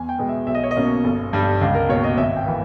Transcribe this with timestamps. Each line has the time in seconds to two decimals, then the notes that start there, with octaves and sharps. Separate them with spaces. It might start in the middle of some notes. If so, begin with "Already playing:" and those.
Already playing: E2 G#5
0.09 G5
0.19 B2 G#3 B3
0.29 E5
0.47 B1 E5
0.55 D#5
0.63 C#5
0.71 D#5
0.76 B2 A#3 C#4
1.04 G1
1.33 G2 G3
1.61 C#2
1.75 A#4
1.89 B2 A#3 C#5
2.04 D#5
2.17 G#1 E5
2.36 G5
2.46 E3 A#3